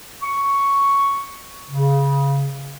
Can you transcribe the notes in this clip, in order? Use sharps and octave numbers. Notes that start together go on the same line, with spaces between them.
C#6
C#3